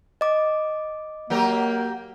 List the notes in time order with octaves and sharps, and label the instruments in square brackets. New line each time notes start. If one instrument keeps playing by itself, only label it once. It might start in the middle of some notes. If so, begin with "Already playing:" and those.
[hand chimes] D#5 D6
[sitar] F#3 G4 A#4 [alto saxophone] A#3